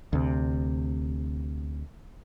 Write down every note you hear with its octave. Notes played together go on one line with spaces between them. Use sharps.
D2 C3